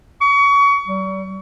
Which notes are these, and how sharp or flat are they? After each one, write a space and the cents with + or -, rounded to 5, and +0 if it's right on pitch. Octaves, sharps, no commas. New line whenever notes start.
C#6 +30
G3 -35